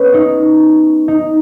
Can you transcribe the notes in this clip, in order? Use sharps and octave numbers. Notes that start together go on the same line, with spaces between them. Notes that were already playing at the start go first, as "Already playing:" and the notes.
Already playing: B3 C#4
D#4
D#4